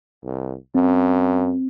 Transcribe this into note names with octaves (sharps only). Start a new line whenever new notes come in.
C2
F#2 C4